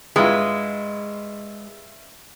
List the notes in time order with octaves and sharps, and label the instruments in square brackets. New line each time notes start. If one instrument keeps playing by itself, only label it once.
[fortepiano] G2 E4 F4 [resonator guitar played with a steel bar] G#3